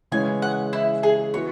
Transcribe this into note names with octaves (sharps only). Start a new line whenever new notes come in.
C#3 E3 G#3 E4 C#5 G#5
F#5
E4
G#4
E3 B3 F#4 B4 C#5